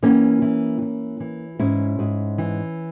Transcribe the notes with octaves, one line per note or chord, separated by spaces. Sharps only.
E3 A#3 C#4
E3
E3
E3
G#2 C#4 E4
G#2
E3